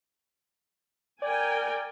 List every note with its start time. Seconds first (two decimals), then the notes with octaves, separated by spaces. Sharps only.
1.22 A#4 D5 G5 G#5